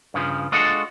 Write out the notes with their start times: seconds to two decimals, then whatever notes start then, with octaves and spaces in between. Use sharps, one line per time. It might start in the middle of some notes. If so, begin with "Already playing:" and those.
0.14 G2 C#3 F3
0.52 G#3 D4 F4 F#4 A4 D#5